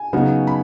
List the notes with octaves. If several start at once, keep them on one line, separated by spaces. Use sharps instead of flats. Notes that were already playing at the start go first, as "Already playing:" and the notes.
Already playing: G#5
C#3 F#3 B3 D#4
B5